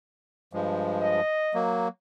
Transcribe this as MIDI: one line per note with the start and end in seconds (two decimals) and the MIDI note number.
0.53 1.21 43
0.53 1.21 53
0.53 1.21 56
1.02 1.64 75
1.54 1.88 54
1.54 1.88 58